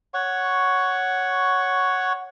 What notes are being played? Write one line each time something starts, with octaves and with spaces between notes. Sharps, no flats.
C#5 F#5 C#6